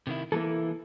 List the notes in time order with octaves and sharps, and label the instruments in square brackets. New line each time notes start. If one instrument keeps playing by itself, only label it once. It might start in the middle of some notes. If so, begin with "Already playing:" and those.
[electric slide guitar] C3 D#3 E4
[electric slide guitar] E3 [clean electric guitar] A#3 E4 A4